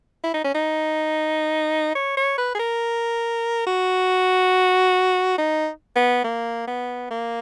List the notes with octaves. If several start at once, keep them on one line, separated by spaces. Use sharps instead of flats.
E4
D#4
C#4
D#4
C#5
C#5
B4
G#4
A#4
F#4
D#4
B3
A#3
B3
A#3